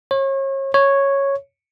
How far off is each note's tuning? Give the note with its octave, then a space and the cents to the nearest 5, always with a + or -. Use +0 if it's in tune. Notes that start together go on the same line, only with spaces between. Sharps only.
C#5 -35
C#5 -5